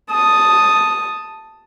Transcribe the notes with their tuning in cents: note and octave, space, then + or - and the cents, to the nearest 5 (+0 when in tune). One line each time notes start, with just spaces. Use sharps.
A5 +0 D#6 +0